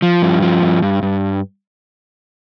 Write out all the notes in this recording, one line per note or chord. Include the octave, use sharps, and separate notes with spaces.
F3
G2
F3
G2
G2
G2